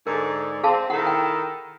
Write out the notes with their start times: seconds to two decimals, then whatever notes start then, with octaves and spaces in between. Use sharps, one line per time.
0.07 G#2 D3 A#4
0.63 C4 G#4 F5 A5
0.90 D#3 E4 A4 F#5
1.07 G5